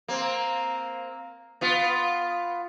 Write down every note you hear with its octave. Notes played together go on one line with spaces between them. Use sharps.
A#3 C4
B3 F4